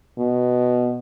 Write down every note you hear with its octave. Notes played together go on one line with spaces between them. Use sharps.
B2